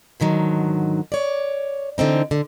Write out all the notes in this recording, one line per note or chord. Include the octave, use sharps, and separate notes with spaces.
G#2 D3 D#3 F#3
C#5 D5
D3 E3 C4 D#4
D3